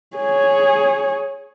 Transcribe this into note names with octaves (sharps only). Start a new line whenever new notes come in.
G#4 C#5